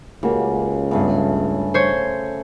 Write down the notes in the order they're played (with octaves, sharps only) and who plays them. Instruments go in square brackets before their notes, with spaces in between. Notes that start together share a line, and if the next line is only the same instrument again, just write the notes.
[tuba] C#2 [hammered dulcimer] C#3 [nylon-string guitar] A#3 F#4 G4
[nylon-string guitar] G2 B3 [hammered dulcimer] C#3 A3
[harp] C5 C#5